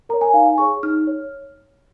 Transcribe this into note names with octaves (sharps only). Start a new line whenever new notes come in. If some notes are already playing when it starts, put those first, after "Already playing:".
A#4 C#5 A#5
G#5
D#4 F5
G#5
G#4 C#5 C#6
D#4 F6
C#5